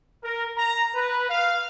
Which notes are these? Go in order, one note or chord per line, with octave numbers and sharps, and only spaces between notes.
A#4
A#5
B4
F5